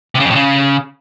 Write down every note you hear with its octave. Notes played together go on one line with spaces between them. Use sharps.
C3
C#3
F2
A2
C#3